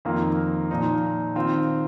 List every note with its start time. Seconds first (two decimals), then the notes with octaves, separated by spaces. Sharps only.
0.05 F2 D#3 A#3 F4
0.71 A#2 F3 D#4
1.36 D#3 C4 F4